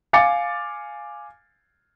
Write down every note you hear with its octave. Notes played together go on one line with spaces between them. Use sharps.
F5 G#5 D6 A6 C#7